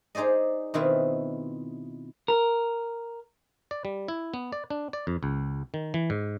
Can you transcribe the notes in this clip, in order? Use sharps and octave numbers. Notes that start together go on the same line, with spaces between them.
D#4 G#4 C5 D5 D#5
B2 D#3 C4 E4 F4 B4
A#4
D5
G3
E4
B3
D5
D4
D5
F2
C#2
D#3
E3
G#2